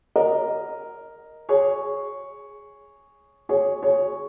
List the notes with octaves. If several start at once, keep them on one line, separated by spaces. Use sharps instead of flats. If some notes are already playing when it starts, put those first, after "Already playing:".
A#4 D#5
G#4 C#5
G#4 C#5
G#4 C#5